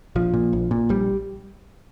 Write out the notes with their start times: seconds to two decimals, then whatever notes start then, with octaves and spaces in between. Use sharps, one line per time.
0.16 A#1 F3
0.34 A#2
0.53 A#1
0.71 A#2
0.89 A#1 G3